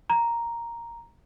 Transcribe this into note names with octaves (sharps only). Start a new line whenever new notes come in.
A#5